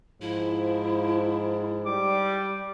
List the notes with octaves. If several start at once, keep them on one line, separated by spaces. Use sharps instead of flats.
G#2 F3 E4
G3 D6